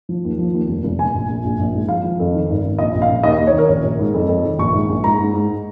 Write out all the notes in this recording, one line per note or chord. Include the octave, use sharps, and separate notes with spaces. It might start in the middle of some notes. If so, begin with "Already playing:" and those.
F3
D#2
F3
D#2
F1
F1
A#2 G#5
A#1
A#1
A#1
A#1
G#2
F3 F5
F3
F2
D#3
G#1
G#1
A#1 D#5
A#1
F5
A#2
D#2 D#5
D#2
C#5
D#3 A#4
A#1 C#5
A#1
G#2
F2
F2
D#3
A#1 C#6
G#2
A#1
G#2 A#5
G#2
G#2